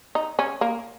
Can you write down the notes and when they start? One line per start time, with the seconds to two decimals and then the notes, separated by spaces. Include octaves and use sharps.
0.15 D#4
0.39 C#4
0.61 A#3